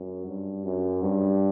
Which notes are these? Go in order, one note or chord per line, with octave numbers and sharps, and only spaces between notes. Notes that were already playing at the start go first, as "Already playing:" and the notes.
Already playing: F#2
G2
F#2
G2